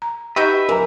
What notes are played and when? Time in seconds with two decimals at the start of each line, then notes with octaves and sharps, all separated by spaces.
0.02 A#5
0.36 D#4 F#4 G4 B4 E5 G5 C#6
0.69 E3 A#4 A#5